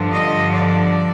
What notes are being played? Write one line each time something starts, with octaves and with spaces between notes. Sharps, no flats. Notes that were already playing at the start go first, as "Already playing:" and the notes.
Already playing: G2 D3 F3
D#5
D5